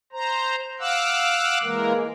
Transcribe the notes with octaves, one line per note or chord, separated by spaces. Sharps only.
C5 A#5
F5 F#5 D6 E6 F#6
E3 G#3 A#3 A#4